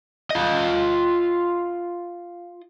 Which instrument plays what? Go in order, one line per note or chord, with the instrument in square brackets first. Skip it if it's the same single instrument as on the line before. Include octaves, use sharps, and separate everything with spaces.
[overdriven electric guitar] F4 D#5